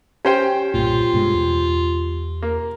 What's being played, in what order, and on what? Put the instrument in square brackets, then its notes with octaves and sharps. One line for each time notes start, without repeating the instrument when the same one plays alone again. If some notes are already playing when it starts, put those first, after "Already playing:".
[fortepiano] C#4 C5 G5 [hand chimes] G4
[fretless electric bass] B1 G2 A#2 [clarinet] F4
[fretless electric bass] G2 B2 G#3
E2 B2
[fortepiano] A#3